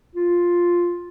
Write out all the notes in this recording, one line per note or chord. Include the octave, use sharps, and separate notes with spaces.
F4